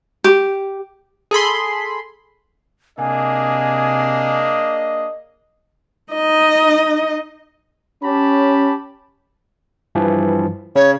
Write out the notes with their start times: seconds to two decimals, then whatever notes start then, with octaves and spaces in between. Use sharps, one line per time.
0.24 G4
1.31 G#4 A4 B5 C6
2.99 C3 A#3 D4 G#4 D#5 G#5
6.14 D#4 D#5
8.03 C#4 G4 A5 B5
9.95 G2 E3 F3
10.76 C#3 C#5